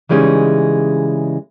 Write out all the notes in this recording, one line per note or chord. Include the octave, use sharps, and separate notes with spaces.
C#3 E3 G3 G#3 C#4 D#4